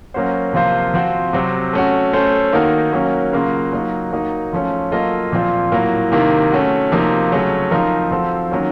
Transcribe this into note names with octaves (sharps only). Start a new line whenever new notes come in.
F#3 A#3 C#4 F#4 C5
C3 F3 A#3 F4 C5
F3 C4 F#4
C3 F#3 C4
A3 C#4 F#4
A3 C#4 A4 C5
D#3 A#3 D#4 F#4 A#4
F#3 A#3 C#4 F#4
C#3 F#3 A#3 F4
F#3 A#3 D#4 F#4
F#3 A#3 D#4
F3 A3 C#4
F#3 A#3 F4 A4 D#5
A#2 F3 C4 F4
A2 F#3 A#3
C3 D#3 A#3
A3 C#4 F#4
C3 F3 A#3 D#4
C#3 F#3 A3 C#4
F3 C4 D#4 A#4
F3 C4 F#4 A4
D#3 F#3 A#3 C#4